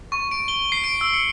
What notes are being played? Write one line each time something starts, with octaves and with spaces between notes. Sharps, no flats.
C#6
D7
G7
C7
D7
E6
C#7